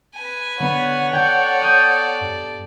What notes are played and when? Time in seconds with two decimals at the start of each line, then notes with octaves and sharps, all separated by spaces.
0.15 B4 G#5
0.60 D3 B3 C#5 F#5
1.13 A4 D5 G5 G#6
1.62 D#6 G6
2.21 G2